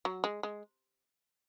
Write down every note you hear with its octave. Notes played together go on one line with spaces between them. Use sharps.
F#3
G#3
G#3